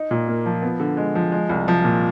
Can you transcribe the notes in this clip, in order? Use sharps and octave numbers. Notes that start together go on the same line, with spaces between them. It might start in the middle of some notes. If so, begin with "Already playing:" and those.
Already playing: D#4
A#2
A#3
F3
B3
D3
G#3
F3
G#3
C2
F3
A#2